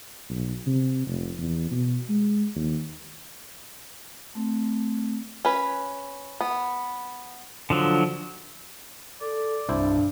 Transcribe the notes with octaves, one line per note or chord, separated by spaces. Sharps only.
B1
C3
F1
E2
B2
G#3
D#2
A3 C4
C#4 B4
B3
D3 F3 F#3
A4 D5
C2 G2 D4 E4 C5